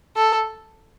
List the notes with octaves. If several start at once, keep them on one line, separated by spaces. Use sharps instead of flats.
A4